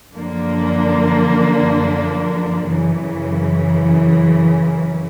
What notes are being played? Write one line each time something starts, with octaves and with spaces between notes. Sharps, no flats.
F#2 D3 F3 A#3 D4
F#2 C#3 E3